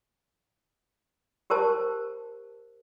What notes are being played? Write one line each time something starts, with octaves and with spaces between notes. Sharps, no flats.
G4 A#4 C5 A5